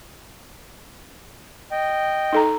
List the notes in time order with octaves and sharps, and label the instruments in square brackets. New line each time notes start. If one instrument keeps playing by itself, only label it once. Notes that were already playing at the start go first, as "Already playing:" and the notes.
[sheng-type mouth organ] D#5 G5
[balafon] D#4 A4 A#5